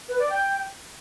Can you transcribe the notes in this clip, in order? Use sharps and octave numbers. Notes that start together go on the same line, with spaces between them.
B4
D5
G5